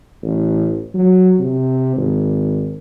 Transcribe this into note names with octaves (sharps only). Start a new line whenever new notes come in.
A1
F#3
C3
G#1